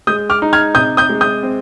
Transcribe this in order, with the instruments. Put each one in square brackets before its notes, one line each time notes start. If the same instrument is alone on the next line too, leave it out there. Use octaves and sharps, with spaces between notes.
[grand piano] G#3 D#6 G6
D6 F6
D#4
F6 G#6
C3 D#6 G6
D#6 G6
G#3
D#6 G6
C4